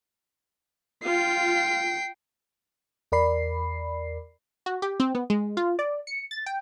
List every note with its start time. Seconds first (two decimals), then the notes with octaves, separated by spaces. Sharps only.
1.05 F4 G5 C7
3.12 E2 A#4 D5 B5 C7
4.66 F#4
4.82 G4
5.00 C4
5.15 B3
5.30 G#3
5.57 F4
5.79 D5
6.07 C#7
6.31 A6
6.46 G5